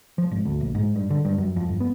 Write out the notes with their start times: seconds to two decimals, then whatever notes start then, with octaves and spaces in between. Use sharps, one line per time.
0.18 F3
0.31 G#1
0.45 D2
0.60 A#1
0.75 G#2
0.96 G2
1.10 D3
1.25 G2
1.38 F#2
1.56 F2
1.69 G1
1.80 B3